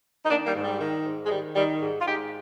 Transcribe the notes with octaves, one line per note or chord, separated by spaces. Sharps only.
D#4
D#3 A#3 D4
G3 A#3
G#2
G3
D#3
G#2
G#3
D#3 G3
D#3 G3
G#2
F4
G#2 D#4 G4